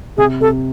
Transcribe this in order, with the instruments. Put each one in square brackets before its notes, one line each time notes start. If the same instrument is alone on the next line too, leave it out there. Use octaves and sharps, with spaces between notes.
[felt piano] C3 [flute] G#4
[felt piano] C3 [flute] A4